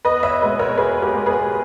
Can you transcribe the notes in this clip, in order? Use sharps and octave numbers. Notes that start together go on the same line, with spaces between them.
E2 B4 D#5
C#5 E5
B2 G#3 B3 B4 D#5
A#4 C#5
E2 G#4 B4
G4 A#4
B2 G#3 B3
G#4 B4